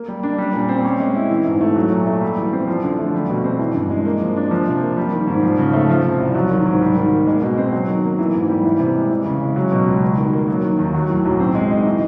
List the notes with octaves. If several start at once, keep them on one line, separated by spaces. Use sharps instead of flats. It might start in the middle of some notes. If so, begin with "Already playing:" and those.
Already playing: A#3
G3
D4
G3
A#2
C4
C#4
G#3
E4
E3
G#2
A3
F#3
A#2
A3
G3
E3
C4
F3
D3
A3
G3
B2
C4
E3
G2
G#3
A#3
F3
D4
F3
C3
A#3
G3
D#3
G#2
F3
C#3
A3
F3
C3
C2
F#3
D#3
G#2
G3
D#3
A#3
G#3
B2
C4
F#3
D#3
A#3
E3
G#2
G3
E3
C3
G#3
E3
C#3
G#3
F#3
B2
C#2
G3
D#3
A#3
F#3
D#3
D#2
F#3
A2
B1
C4
G#3
D#4
E3